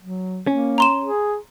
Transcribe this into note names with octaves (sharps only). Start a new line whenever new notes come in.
F#3
A#3 C#4
A#5 C6 E7
G#4